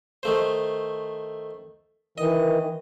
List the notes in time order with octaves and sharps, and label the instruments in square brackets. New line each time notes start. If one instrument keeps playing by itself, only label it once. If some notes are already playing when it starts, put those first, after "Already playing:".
[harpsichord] D#3 A3 C5
[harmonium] D#3 E3 [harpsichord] D#5